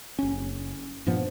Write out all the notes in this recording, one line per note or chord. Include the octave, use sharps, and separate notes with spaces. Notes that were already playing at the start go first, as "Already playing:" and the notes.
F#1 C#4
G2 A#2 F3 B3